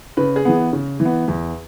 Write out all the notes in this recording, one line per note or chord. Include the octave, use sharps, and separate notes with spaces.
C#3 B4
G#4
E3 B3
C#3
E3
B3
E2